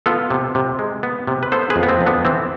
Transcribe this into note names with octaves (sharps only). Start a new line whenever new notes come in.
B3 F4 A4
C3
C3
G#3
B3
C3
B4
B3 A4 C5
G#4 B4
F2
B3
C4
F2
B3 D4
E3 C4